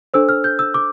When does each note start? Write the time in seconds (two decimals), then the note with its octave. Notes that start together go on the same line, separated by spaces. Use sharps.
0.14 D4 A4 C5 E6
0.29 F6
0.44 G6
0.59 E6
0.74 D6